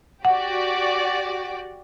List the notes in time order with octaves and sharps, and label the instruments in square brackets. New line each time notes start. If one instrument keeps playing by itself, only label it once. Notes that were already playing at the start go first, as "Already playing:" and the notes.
[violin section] F#4 G4 D5 [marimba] F#5